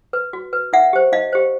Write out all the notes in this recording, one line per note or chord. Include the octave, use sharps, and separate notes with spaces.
B4
F#4
B4
D#4 E5 F#5
G4 C5
D#4 D#5 F5
G4 C5